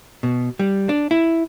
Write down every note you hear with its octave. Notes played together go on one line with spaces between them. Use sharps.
B2
G3
D4
E4